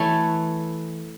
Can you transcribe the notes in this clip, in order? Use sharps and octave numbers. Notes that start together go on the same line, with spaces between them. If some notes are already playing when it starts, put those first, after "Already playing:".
Already playing: E3 A3 A4 C#5